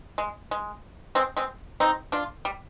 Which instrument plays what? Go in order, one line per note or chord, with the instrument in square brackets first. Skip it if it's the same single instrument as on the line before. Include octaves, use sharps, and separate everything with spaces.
[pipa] G#3
G#3
G#3 C4
G#3 C4
C4 D#4
D4 F4
G3